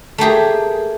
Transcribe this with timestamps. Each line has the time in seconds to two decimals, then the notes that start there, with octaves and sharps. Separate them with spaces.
0.18 A3 A#3 G4 G#4